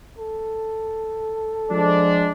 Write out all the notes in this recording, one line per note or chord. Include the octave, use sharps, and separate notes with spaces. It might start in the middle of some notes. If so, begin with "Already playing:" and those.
A4
F3 G#3 D4